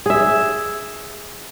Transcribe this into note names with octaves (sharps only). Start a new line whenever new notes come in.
G#4 E5